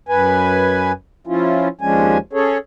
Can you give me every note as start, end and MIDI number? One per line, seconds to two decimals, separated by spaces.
0.09 0.92 42
0.09 0.92 71
0.09 0.92 80
1.27 1.68 53
1.27 1.68 61
1.27 1.68 64
1.27 1.68 65
1.81 2.18 39
1.81 2.18 53
1.81 2.18 56
1.81 2.18 61
1.81 2.18 62
1.81 2.18 80
2.33 2.58 61
2.33 2.58 68
2.33 2.58 69
2.33 2.58 73